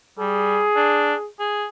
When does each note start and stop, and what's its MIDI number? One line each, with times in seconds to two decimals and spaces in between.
0.19 0.63 55
0.19 1.28 68
0.76 1.15 62
1.39 1.66 68